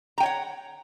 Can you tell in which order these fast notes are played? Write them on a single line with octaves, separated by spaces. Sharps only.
A#5 G5 C#5 F#5